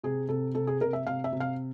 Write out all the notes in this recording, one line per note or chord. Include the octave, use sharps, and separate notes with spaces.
C3 G#4
C3 A4
C3 A4
G#4
C3 A#4
E5
C3 F5
E5
C3
F5